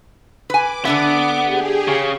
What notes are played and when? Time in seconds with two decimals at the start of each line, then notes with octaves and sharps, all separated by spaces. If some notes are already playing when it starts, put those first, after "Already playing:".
0.50 B4 G#5 D6
0.85 D3 B3 D4 E5
1.44 G4 G#4
1.88 C#3